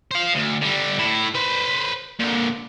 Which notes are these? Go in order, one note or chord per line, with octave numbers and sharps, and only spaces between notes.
C5 F5
D2
D3 G3
A2 E4
B4 C5
A#2 D3